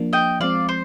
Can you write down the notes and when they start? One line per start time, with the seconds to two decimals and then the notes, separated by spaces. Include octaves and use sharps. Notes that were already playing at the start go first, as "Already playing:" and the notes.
Already playing: F3 A#3 D4
0.13 D#5 G5
0.40 F3 G#3 C4 D5 F5
0.69 C5